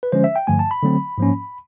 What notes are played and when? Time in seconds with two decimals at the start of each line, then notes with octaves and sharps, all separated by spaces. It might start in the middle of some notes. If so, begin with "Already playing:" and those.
0.03 B4
0.12 D3 F3 G#3 C#4 C5
0.24 E5
0.36 G5
0.47 G2 D3 F3 A3 G#5
0.59 A5
0.71 B5
0.83 D3 F#3 A3 C4
1.18 G#2 F3 A#3 C#4